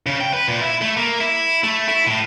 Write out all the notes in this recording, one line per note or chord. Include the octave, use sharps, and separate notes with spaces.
C#3
G5
B4
A#2
E4
A3
A#3
E4
A3
E4
A2